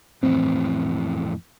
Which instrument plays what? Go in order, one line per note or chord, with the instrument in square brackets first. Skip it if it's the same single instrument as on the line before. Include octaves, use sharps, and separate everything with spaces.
[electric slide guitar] F2 A2 E3 [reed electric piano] C4